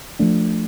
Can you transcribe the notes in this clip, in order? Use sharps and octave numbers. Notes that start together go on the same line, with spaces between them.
F3 A3 D4